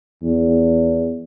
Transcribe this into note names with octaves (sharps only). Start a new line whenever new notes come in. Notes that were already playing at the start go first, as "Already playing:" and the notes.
E2